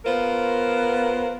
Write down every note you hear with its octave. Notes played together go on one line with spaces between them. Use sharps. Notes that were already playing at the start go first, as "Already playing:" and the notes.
B3 F4 A#4 C5